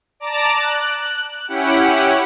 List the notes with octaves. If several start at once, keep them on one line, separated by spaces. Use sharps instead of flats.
D5 A5 A#5 D6
F#6
C#4 E4 G4 F#5